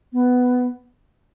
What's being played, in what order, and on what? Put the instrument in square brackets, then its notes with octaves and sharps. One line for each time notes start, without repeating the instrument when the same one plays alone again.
[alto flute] B3